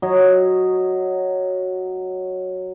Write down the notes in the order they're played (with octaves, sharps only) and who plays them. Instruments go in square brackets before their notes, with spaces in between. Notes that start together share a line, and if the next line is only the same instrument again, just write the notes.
[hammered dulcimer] F#3 C#5 D#5